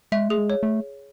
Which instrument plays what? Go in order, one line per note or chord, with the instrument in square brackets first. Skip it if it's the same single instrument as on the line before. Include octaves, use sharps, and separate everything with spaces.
[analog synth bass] G#3 [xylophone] E5
[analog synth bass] A3 [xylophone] G#4
[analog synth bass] G#3
[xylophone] C#5
[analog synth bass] A3